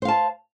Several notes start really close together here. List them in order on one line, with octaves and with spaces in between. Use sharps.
C5 F5 A5